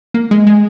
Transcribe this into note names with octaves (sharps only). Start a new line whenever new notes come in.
A#3
G#3
G#3